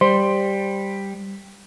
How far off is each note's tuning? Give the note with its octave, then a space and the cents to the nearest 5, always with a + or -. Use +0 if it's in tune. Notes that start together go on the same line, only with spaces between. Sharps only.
G3 +5 C5 +0